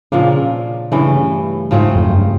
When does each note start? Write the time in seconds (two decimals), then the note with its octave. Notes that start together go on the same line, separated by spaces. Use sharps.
0.12 A#2 C#3 F3 A#3 D4
0.92 G2 C#3 E3 A3
1.71 G#2 C#3 F3 A3 C4
1.96 F2
2.04 F#2
2.12 G2